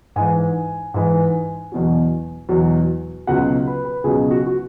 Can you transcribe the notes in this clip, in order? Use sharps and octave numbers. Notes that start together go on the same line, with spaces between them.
G#2 E3 G#5
G#2 E3
E2 B2 F#3
E2 B2 F#3
C#2 B2 F#3 F#5
B4
B4
C#2 B2 F#3 G#4
F#4
F#4